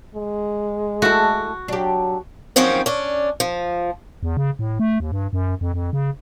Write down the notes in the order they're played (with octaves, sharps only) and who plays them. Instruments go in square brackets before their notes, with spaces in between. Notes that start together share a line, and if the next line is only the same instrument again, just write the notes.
[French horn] G#3
[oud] A3 E4 [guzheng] F#4
[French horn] F#3 [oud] D4 G4
[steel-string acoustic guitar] D#3 F3 F#3 A#3 C4 C#4
C#4 D4
F3
[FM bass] E2
C#3
A2
A3
D#2
G2
F#2
F2
F2
C#3